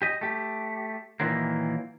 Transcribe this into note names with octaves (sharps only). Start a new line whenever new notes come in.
G4 D#5
A3 G4
A#2 D#3 E3 F#3 A#3